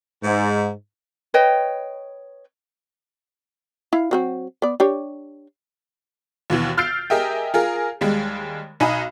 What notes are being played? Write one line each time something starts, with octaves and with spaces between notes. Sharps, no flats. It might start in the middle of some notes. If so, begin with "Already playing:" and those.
G#2
B4 C#5 D#5 G5
E4 F5
F#3 C4 F#4
B3 D5
D4 G4 C#5
D#2 B2 E3
E6 F6 G6 A6 C7 D7
G4 G#4 A#4 D#5 E5 G5
F4 G#4 A#4
D#2 G3 G#3
B1 D#4 G#5 B5 D#6